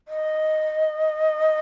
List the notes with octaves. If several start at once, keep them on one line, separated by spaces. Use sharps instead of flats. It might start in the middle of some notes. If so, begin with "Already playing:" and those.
D#5